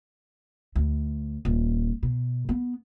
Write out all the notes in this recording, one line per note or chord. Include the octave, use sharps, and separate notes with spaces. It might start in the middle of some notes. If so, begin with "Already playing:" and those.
D2
D#1
B2
B3